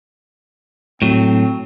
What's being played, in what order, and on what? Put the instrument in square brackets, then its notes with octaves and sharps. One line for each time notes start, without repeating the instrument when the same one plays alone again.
[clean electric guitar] A2 F#3 [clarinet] C4